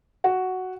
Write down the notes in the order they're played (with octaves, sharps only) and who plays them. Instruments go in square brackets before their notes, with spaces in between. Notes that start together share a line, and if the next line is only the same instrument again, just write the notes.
[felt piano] F#4